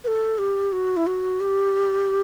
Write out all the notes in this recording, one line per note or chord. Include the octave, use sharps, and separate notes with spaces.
B4
A4
G4
F#4
E4
F#4
G4